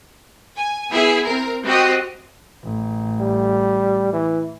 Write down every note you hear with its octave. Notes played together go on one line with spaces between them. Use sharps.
G#5
B3 E4 G#4 E5
C4 A#4
C4 F#4 G4 D#5
A1
G3
E3